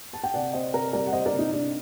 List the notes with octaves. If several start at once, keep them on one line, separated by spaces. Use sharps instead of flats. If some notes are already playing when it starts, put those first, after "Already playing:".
A5
G5
C3 D5 F#5
C3 C5 D#5
C3 A#4 D5
G3 A#4 D5
F#5
G3 C5 D#5
A#4 D5
C3
D#4
C3 D4